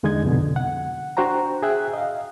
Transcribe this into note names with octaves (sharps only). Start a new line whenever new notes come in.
E2 D3 G#3 D#4 D#5 G#6
C2 F2 B2 D3
F#5
D4 F#4 C5 G5 A#5
G#4 E5 G5 F#6
D#5 F5